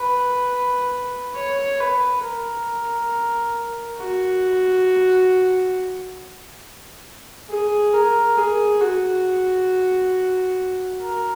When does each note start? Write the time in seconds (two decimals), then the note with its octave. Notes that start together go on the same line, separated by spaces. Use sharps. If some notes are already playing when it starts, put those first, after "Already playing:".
Already playing: B4
1.36 C#5
1.80 B4
2.23 A#4
3.98 F#4
7.50 G#4
7.93 A#4
8.38 G#4
8.81 F#4
11.01 A#4